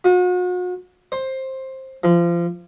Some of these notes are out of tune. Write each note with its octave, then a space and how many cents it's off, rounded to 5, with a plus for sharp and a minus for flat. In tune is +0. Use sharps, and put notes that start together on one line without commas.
F#4 -40
C5 +15
F3 -25